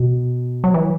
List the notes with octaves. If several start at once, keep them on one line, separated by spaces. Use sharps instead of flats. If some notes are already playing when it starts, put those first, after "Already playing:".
Already playing: B2
F#3
E3